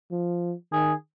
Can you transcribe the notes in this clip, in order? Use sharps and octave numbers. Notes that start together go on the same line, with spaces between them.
F3
D#3 G#4